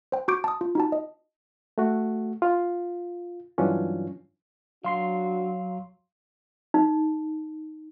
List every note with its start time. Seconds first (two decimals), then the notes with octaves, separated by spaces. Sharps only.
0.12 C5 G5
0.28 F#4 C#6 D6 G6 D7
0.44 A5 D#6
0.61 F4
0.75 D#4 F#4 A5
0.92 D#5
1.78 A3 F#4
2.42 F4
3.58 G2 E3 F#3 C#4 D4 F4
4.84 F#3 D4 F#4 F5 C6 C7
6.74 D#4